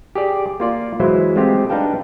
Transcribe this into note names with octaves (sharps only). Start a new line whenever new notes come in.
G4 G#4 D5
A#3 F4 D5
E3 F#3 G#3 E4 C5
G#3 A3 C4 F4 G4
D4 D#4 B4 F5 G5 A5